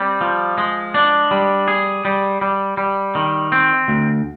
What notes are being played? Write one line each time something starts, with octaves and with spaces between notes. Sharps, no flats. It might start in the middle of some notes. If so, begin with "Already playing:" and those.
Already playing: G3 C4
F3
G#3
D4
G3
G#4
G3
G3
G3
D#3
C4
D2